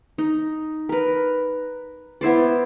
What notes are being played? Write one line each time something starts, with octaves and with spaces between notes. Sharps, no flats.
D#4
A#4 B4
B3 E4 C5 D5